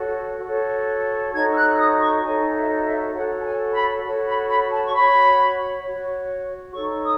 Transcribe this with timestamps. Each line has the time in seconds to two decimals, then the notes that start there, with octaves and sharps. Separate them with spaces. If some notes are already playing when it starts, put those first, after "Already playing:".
Already playing: F#4 A4 C#5
0.43 F#4 A4 C#5
1.33 D#4 F#4 A4 C#5 G#6
1.51 E6
1.56 F#6
1.73 E6
1.78 D#6
2.00 C#6
2.23 D#4 F#4 A4 C#5 G#5
2.53 E5
2.75 D#5
2.83 E5
3.13 F#4 A4 C#5 F#5
3.38 A5
3.43 G#5
3.73 B5
4.03 F#4 A4 C#5
4.25 B5
4.48 B5
4.70 A5
4.85 C#6
4.92 F#4 C#5 B5
5.82 F#4 C#5
6.72 D#4 A4 C#5 C#6
7.03 D#6